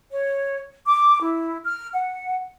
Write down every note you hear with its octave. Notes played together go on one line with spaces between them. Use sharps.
C#5
D6
E4
F6
F#5